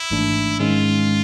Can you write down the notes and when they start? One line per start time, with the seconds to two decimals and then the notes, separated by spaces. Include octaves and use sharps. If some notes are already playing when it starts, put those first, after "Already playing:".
Already playing: E4
0.10 G#1 G#2 E3 A3 D4
0.60 G#2 D#3 G#3 C#4 F4